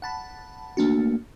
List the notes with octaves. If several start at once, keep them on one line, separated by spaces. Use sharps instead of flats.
F#5 A5 B5
A3 A#3 D4 F#4